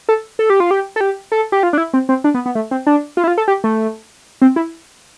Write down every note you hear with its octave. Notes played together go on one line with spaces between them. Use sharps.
A4
A4
G4
F4
G4
A4
G4
A4
G4
F4
D4
E4
C4
C4
D4
B3
B3
A3
C4
D4
F4
E4
F4
A4
G4
A3
C4
E4